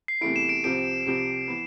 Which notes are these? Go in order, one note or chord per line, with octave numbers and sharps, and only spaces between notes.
C7
E2 C3 E3 A3 E4 D7
E7
D7
C2 C3 F3 C4 G4 D7
C2 C3 F3 C4 G4
E3 B3